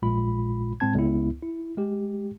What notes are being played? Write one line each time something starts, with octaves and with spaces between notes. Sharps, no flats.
A#1 A#2 G#3 F4 B5
A2 G#3 C4 A5 G#6
C#2 B3 E4
E4
G#3 G4